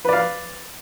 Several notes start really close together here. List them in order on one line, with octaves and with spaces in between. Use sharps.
B4 D5 F5